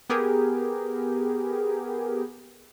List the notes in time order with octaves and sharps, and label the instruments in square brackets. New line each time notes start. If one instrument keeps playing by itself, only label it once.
[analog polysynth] B3 G4 G#4 A#4